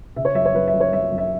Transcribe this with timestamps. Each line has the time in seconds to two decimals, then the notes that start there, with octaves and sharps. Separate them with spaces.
0.16 C#3 E5
0.25 C#5
0.34 F#2 E5
0.45 C#5
0.54 F#2 B4
0.68 E5
0.74 F#2
0.80 C#5
0.93 F#2 E5
1.12 F#2
1.18 E5